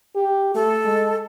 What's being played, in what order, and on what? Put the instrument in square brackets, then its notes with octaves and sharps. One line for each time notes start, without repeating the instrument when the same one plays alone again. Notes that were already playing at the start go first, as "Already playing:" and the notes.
[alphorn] G4
[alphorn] A3 [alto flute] A4
[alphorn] G#3